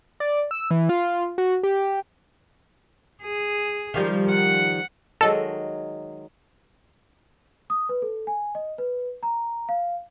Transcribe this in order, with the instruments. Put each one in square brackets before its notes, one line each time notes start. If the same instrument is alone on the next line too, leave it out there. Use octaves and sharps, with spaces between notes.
[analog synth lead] D5
E6
E3
F4
F#4
G4
[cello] G#4
[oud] D#3 F3 G3
[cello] F#5
[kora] D#3 F#3 G#3 [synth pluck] A4
[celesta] D#6
B4
A4
G#5
D#5
B4
A#5
F5